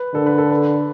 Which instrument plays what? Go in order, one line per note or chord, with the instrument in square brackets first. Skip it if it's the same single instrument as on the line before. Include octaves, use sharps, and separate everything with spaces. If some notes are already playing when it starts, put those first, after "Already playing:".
Already playing: [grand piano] B4
[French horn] D3 [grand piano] A4
[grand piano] B4
A4
B4